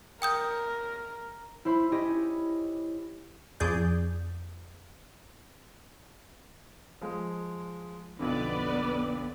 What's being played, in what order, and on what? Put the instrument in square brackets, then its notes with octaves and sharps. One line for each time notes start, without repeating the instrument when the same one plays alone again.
[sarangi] A#4 [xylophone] G5 D#6 G6
[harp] E4 C5 B5
C#4 E4 G4 D#5
[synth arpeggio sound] F2 G#4 D5 G6
[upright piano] F3 G#3
[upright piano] B1 F2 D3 [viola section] B3 B4 D5